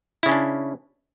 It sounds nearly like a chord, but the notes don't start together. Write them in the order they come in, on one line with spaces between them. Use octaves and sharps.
E4 C#3 C#4 D4